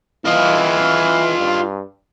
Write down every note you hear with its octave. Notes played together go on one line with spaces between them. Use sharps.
E3 F4 D#5
G2